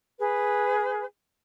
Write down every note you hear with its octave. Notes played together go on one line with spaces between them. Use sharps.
G#4 B4